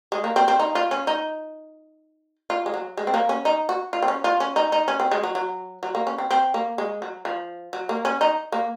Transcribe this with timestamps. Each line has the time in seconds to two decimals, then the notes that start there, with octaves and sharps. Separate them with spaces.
0.12 G#3
0.24 A#3
0.36 C4
0.48 C4
0.59 D#4
0.75 F4
0.91 C#4
1.07 D#4
2.50 F4
2.66 G#3
2.74 F#3
2.97 G#3
3.07 C4
3.14 A#3
3.29 C#4
3.45 D#4
3.69 F#4
3.93 F4
4.02 C4
4.08 C#4
4.24 F4
4.40 C#4
4.56 D#4
4.72 D#4
4.88 C#4
5.00 C4
5.11 G#3
5.23 F#3
5.35 F#3
5.83 F#3
5.95 A#3
6.07 C#4
6.18 C4
6.31 C4
6.54 A#3
6.78 G#3
7.02 F#3
7.25 F3
7.73 F#3
7.89 A#3
8.05 C#4
8.21 D#4
8.52 A#3